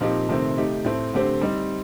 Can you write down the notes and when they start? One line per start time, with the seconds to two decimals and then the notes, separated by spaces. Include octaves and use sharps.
0.01 A#2 F3 C4 D#4 G4
0.29 C3 D#3 A3 C4
0.58 A3 D#4 G4
0.84 A2 A3 C4
1.13 D3 A3 C4 G4 C5
1.41 G3 C4 D#4